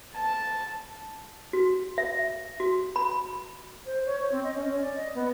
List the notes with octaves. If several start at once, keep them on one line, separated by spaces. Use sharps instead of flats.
A5
F#4
E5
F#4
B5
C5
C#5
C#5
C4
D#5
C#4
C#4
D5
D#5
B3